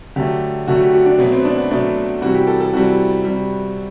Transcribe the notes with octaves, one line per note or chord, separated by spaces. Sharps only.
D3 F#3 A3 G4
D3 F#3 A3 F#4
G4
F#4
D4
B2 F#3 A3 B3
C4
D4
B3
B2 F#3 A3 D4
C3 E3 G3 F#4
G4
A4
A4
C3 E3 G3 F#4
C3 G3